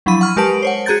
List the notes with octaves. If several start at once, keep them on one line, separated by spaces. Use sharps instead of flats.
F3 F#3 D4 E4 B5 D#7
F#5 C#6 F6
G#3 G4 A#4 B4 A5 D7
C5 C#5 F#5
F#4 G#4 A#5 G6 A6